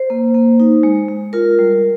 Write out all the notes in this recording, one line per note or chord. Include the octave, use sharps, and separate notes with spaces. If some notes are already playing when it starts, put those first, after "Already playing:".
Already playing: C5
A#3
A#3
D#4
G#3
G#3
F4 A#4
G3